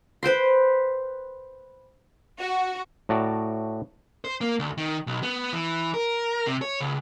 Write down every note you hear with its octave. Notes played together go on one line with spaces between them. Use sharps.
B4 C5 G5 C6
F#4
A2 F#4 D5 A5 A#5
C5
A#3
D2
D#3
B1
B3
E3
A#4
C3
C#5
C#2